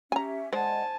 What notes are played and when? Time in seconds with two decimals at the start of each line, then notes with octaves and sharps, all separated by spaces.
0.12 C#4 G4 E5 G#5 A#5
0.53 G#3 C5 D5 D#5 F#5 G#5 A5